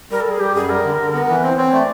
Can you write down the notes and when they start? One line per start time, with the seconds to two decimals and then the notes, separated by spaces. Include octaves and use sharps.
0.11 G3 A#4
0.21 A4
0.26 G3 G#4
0.40 G3 G4
0.55 F#2 G#4
0.69 G3 A#4
0.84 D3
0.99 D3
1.14 B3
1.28 E3 B4
1.43 C4 C5
1.57 C4 C#5
1.73 A3 D5